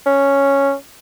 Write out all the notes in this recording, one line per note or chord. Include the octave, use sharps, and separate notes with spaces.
C#4